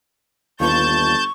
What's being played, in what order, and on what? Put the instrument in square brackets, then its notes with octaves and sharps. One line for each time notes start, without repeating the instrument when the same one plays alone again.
[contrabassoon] G1 [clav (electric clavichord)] D#2 F4 B4 [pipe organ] A5 G6 [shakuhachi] C#6